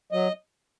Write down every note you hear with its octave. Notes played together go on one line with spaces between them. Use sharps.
F#3 D#5